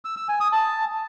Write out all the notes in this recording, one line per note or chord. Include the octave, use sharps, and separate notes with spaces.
E6
E6
G#5
D#6
A5